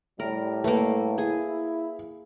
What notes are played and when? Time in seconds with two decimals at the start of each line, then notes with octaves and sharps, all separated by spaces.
0.20 A2 G3 A#4
0.64 A3 A#3 B4
1.18 E4 G#4